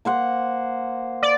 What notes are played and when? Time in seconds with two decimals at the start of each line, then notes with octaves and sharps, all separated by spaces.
0.05 A#3 C5 F#5
1.23 D5